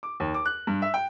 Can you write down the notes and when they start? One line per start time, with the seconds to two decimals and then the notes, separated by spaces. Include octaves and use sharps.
0.03 D6
0.20 D#2
0.34 D6
0.46 F#6
0.67 G2
0.82 E5
0.94 G5